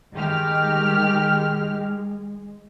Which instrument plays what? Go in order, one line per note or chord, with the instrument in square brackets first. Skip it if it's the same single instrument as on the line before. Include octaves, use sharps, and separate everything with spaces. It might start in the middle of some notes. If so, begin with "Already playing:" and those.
[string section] D#3 G4 F6 [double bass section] G#3